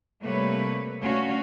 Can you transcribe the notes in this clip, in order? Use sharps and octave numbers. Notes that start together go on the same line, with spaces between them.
C3 G3 A3 A#3 B4 C#5
D2 C#4 F#4 C#5 F5